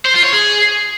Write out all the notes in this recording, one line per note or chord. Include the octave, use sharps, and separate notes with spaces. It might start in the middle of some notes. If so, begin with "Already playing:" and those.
C5
F4
C#5
G#4